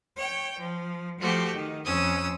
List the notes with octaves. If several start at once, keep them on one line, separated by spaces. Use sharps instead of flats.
C#5 G5
F3
F3 A3 F#4 G4
D#3
F2 C#4 D#6 E6